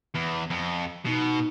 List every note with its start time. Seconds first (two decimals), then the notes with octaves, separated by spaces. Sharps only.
0.15 E2
0.50 F2
1.06 B2 D#4